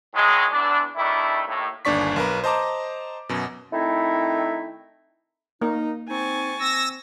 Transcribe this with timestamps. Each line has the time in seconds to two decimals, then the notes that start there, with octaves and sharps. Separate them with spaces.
0.14 A2 D#3 F#3 G#3
0.51 E2 D4
0.96 D#3 G3 A3 D4 E4
1.46 D#2 A2
1.85 G1 D#2 D4 D5 C#6 B6
2.16 B1 A#4 B4
2.44 C5 D#5 A5 A#5 D6
3.29 F#2 B2
3.72 D#3 A3 C4 D#4 E4
5.62 A#3 D#4 A#4
6.09 C4 D#4 G#5 C#6 A6
6.60 C4 E6 A#6